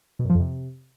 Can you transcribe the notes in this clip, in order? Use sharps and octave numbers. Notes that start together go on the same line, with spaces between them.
B2
F#2
F3
F2
C3